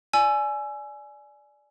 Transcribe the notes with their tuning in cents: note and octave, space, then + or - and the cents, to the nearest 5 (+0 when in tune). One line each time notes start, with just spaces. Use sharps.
D5 +0 G#5 +20 E6 +20